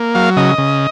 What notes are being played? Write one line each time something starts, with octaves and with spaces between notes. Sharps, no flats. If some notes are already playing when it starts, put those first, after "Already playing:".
Already playing: A#3
F#3 F5
C#3 D#5
C#3